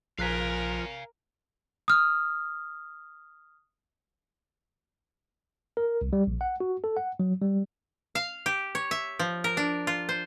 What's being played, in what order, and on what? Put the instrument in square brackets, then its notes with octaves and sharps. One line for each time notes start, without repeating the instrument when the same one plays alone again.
[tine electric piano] A#1 F#6 B6 [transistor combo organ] F3 [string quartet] A#4 [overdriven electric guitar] F5 G#5
[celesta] D#6 F6
[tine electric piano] A#4
C2
G3
A#1
F#5
F#4
A4
F#5
F#3
G3
[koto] F5
G4
C#5
E5
F3
A#4
D4
F4
C5